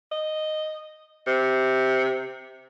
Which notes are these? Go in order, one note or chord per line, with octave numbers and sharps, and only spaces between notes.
D#5
C3